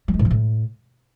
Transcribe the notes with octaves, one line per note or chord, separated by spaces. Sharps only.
G3
G#3
A2
E3
A2